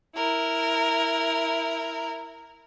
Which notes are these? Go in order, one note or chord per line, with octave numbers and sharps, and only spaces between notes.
E4 A#4